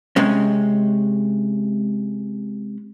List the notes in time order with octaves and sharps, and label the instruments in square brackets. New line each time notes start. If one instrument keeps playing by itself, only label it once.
[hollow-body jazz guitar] C3 G#3 C#4